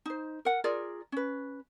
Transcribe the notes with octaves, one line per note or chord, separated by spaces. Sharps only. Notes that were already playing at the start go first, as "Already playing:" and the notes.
D#4 C5
A#4 F#5
F4 G#4 A#4 D5
C#4 B4